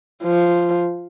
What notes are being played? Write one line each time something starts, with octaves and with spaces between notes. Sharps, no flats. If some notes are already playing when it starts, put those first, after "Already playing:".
F3